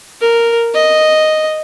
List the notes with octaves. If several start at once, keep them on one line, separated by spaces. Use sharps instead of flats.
A#4
D#5